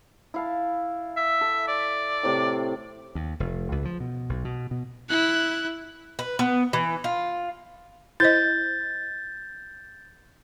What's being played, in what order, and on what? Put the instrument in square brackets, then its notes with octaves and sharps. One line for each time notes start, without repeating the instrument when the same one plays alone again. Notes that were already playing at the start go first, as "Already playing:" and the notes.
[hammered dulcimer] E4 F5 A5
[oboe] E5
[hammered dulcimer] A4
[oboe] D5
[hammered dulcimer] A2 C3
[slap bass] D#2
F1
C#2
F3
B2
B1
B2
B2
[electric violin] E4 F#6
[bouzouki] B4
B3
E3
F4
[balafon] E4 C5 D#5 [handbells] G6 A6